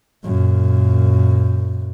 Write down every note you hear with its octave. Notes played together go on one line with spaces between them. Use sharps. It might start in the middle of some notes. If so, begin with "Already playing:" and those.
F#2 A#2